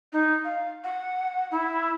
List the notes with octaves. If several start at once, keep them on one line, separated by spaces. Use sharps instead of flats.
D#4
F5
F#5
E4